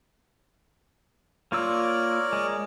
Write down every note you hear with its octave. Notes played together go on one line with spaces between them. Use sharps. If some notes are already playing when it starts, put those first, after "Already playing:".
A#3 F4 A#4 C#5 D5 E6
G#3